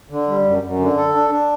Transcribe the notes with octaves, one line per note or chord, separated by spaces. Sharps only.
D3
G3
F#2
F#2
D3
A4
D4
D4